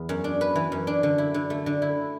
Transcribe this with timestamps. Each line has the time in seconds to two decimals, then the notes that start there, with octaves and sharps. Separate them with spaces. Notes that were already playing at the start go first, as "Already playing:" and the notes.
Already playing: E2
0.09 F#2
0.24 D4
0.41 B4
0.56 E3
0.72 F#2
0.87 D4
1.03 D3
1.18 E4
1.34 D3
1.50 A3
1.66 D3
1.82 E4